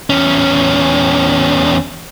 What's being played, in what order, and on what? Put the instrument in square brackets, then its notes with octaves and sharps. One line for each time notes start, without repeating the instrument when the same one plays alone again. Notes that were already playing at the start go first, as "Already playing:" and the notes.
[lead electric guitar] E2 C#4